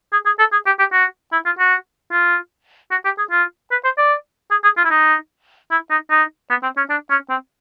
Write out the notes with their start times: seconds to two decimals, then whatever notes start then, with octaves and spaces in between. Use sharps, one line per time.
0.12 G#4
0.26 G#4
0.39 A4
0.52 G#4
0.66 G4
0.79 G4
0.92 F#4
1.32 E4
1.46 F4
1.59 F#4
2.12 F4
2.91 F#4
3.05 G4
3.18 G#4
3.31 F4
3.71 B4
3.84 C5
3.98 D5
4.51 G#4
4.64 G#4
4.77 F4
4.85 E4
4.90 D#4
5.71 E4
5.90 D#4
6.10 D#4
6.50 B3
6.63 C4
6.77 C#4
6.90 D4
7.10 C#4
7.30 C4